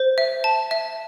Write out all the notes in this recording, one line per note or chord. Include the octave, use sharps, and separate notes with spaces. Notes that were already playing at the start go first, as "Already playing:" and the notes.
Already playing: C5
E5
A5
E5